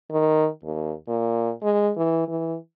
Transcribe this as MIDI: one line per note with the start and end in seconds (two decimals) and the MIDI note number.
0.11 0.48 51
0.64 0.92 39
1.08 1.52 46
1.62 1.91 56
1.96 2.23 52
2.28 2.56 52